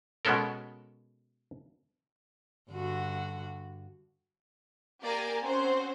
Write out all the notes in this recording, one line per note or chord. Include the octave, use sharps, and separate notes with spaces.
B2 G#3 B3 C#4 A4 A#4
G2 D3 F#4
A#3 G4 D5 G#5 A#5
C4 C#4 F#4 C5